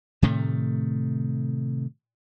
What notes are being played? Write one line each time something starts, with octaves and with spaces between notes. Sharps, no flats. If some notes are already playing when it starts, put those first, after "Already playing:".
A2 C3 D#3 A3